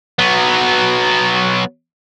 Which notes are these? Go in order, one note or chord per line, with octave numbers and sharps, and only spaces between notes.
F#3 B3